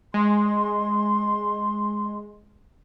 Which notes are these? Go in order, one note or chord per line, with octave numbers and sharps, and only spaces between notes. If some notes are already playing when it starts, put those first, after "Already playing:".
G#3 C6